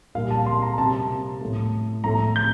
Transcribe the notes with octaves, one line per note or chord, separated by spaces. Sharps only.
A#2 G3 A#3 F5
A5
C6
A#5
C3 G3 A#3 A5
A2 A3
A2 A3 A#5
G6